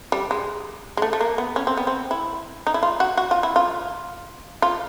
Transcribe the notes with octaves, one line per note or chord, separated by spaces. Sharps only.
G3
G#3
G#3
A3
A3
A#3
B3
C#4
C4
B3
C4
E4
D#4
E4
F4
F#4
F#4
F4
E4
F4
F4